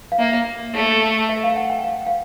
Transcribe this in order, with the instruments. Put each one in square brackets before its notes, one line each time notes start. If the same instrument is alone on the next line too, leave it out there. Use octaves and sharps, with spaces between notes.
[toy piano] F5
[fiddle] A#3 [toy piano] E5
[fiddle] A3
[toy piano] E5
F5
F#5
G5
F5
F5